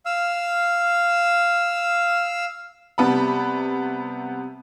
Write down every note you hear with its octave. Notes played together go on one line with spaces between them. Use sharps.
F5 E6
C3 G3 B3 A5 B5